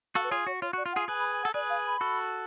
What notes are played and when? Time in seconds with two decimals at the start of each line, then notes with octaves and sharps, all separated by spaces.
0.15 F#4 A4 F5
0.24 B4
0.30 F4 G#4 C#5
0.47 F#4 C#5
0.61 F4 C#5
0.73 F#4 D5
0.86 F4
0.93 F#5
0.96 F4 G#4
1.08 G#4 B4 G#5
1.20 B5
1.32 G#5
1.43 A4 F#5
1.54 G#4 B4 D5
1.70 F5
1.86 B5
2.01 F#4 A4